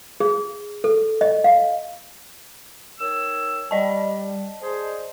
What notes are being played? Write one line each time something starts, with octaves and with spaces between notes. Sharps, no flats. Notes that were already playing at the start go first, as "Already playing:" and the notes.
G#4
A4
D#5
F5
D#3 C#5 E6
G3 D5 D#5 A5
G#4 C5